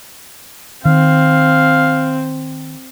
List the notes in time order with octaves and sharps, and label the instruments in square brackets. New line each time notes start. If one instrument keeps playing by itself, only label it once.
[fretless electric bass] D#3 [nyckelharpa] C4 [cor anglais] F5